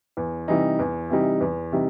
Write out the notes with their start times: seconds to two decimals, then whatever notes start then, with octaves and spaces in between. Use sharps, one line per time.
0.17 E2
0.48 C3 E3 G3 D#4
0.79 E2
1.10 C3 E3 G3 D#4
1.40 E2
1.72 C3 E3 G3 D#4